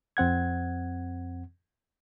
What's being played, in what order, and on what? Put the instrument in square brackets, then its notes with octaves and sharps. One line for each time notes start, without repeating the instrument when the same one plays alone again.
[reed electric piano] F2 C4 F#5 G#6